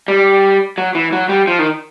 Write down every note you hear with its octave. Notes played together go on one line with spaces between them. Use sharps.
G3
F#3
E3
F#3
G3
F3
D#3